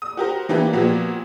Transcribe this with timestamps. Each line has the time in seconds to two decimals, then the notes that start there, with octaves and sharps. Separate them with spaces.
0.02 D#6
0.17 F#4 G4 A#4 C5
0.49 E3 A#3 B3 D4 G4 B4
0.73 A#2 F3 A#3 B3 F#4 G4